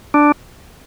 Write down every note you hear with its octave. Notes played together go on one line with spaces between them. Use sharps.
D4